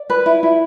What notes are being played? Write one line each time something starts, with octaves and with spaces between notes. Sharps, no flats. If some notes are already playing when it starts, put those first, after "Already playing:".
Already playing: D5
B4
E4
E4